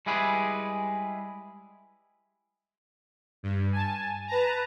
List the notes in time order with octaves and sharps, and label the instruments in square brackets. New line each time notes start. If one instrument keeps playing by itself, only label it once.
[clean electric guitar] G3 G#3 E4 G#4 B4
[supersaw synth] G2
G#5 A5
B4 A5 A#5